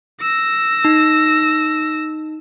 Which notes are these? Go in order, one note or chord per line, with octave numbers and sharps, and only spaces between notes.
E6 A#6
D#4